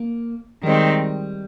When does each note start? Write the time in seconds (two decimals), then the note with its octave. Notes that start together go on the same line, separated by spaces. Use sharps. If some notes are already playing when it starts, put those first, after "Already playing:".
Already playing: A#3
0.63 D#3 G3 G#3 C4 D#4